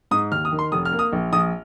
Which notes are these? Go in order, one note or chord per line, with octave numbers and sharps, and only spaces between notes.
G#2 D#6
D#2 F6
D#6
D#3
C6
F1 D#6
F6
A#3
D#6
A#1
A#1 D#6